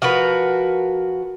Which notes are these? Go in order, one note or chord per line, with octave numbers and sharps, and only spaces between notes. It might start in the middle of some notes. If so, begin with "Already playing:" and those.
F3 F#4 A#4 B4